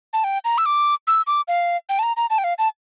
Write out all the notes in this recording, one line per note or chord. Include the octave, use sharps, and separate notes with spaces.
A5
G5
A#5
E6
D6
E6
D6
F5
G5
A5
A#5
A#5
A5
G5
F5
A5